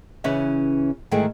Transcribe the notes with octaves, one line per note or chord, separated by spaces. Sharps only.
C#3 E3 C#4 B4 E5
G#2 D#3 E3 A3 G#4 G5